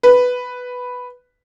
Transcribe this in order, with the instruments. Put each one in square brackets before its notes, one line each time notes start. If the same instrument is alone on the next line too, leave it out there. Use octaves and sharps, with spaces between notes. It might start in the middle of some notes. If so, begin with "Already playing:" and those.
[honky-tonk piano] B4